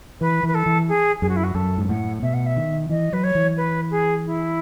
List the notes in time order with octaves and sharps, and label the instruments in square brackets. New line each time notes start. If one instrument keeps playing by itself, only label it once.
[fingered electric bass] E3 [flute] B4
[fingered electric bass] E3 [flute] B4
[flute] A4
[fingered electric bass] E3
[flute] G#4
[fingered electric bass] F#2 [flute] G#4
[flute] F#4
E4
F#4
[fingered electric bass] F#2 [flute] A4
[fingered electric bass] G#2
[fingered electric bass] A2 [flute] F#5
[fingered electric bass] B2 [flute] E5
[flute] F#5
E5
[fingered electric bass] D#3
[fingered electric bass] E3 [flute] D#5
[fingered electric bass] F#3 [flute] B4
[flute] C#5
[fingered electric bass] E3
[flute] B4
G#4
E4